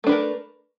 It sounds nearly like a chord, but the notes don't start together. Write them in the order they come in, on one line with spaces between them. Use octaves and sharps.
A3 D4 B4 A#4